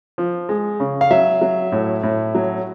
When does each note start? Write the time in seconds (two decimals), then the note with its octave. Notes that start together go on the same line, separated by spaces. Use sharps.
0.18 F3
0.49 G#3
0.80 C#3
1.01 F5
1.11 F#3 E5
1.41 F#3
1.72 A2
2.03 A2
2.35 F#3